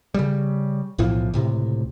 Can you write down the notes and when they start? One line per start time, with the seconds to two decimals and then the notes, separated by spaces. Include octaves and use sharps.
0.14 C#3 G3
0.98 B1 A2 E3 F3
1.34 C#2 A2 C3